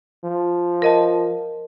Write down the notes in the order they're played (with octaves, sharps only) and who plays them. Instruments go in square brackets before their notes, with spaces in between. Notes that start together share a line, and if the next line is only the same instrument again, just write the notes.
[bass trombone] F3
[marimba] A#4 D#5 A5